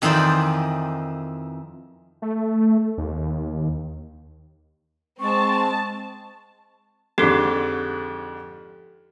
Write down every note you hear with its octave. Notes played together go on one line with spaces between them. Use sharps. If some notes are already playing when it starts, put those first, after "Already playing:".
F2 D#3 E3 D#4 C5 D5
A3
D#2
G#3 C4 A5 C#6
F2 G#2 D3 G4 A4